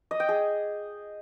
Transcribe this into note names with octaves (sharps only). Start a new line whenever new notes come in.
D#5
G5
G#4